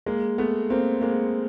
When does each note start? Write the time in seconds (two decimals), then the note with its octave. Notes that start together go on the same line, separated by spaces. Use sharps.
0.06 G#3 A#3
0.38 A3 B3
0.70 A#3 C4
1.01 G#3 A#3